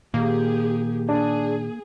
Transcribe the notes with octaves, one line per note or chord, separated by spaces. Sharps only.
A#2 D#3 A#3 G4 G#4
D4 G#4